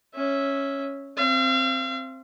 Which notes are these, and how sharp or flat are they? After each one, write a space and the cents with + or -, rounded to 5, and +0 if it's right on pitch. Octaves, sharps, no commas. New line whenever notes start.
C#4 -5 E5 -10
C4 +5 F5 -40